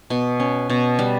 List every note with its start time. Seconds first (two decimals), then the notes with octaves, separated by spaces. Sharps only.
0.10 B2
0.40 C#4
0.70 B2
0.99 G3